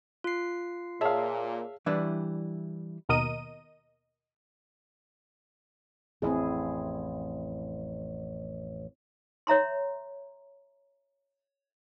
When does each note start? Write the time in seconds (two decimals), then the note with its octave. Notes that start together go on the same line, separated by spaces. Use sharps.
0.24 F4 C7
1.01 A#2 G#4 C#5 E5 F5 A5
1.86 E3 G3 D4 E4 B4
3.09 D#2 B2 A#4 D#5 D#7
6.22 A1 F2 C4 E4 G#4
9.47 C#5 E5 A#5 C6